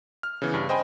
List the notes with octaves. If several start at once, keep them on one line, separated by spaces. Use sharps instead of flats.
F6
C#3 E3 B3
G2
C5 D#5 G5 G#5 B5